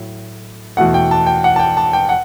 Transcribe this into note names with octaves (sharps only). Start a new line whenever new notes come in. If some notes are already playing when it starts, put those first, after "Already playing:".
Already playing: A2 F#3
E2 B2 A3 F#5
G5
A5
G5
F#5
A5
G5
A5
G5
F#5